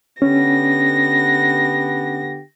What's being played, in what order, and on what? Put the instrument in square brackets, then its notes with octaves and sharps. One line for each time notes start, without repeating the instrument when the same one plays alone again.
[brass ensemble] D3 B3 G4 [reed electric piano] C#4 [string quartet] A#6